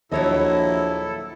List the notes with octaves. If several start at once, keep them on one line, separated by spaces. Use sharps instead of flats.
A#1 D#2 F#3 E4 A4 C#5 D#5